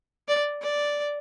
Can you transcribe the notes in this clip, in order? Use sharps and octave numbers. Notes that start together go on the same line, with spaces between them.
D5
D5